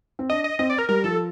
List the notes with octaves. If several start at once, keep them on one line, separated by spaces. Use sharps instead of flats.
C4
D4 D#5
D#5
C4 D#5
D5
A#4
G3 A#4
F3 A4